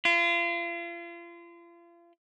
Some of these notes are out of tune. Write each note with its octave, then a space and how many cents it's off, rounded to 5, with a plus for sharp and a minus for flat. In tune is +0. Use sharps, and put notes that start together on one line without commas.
F4 -35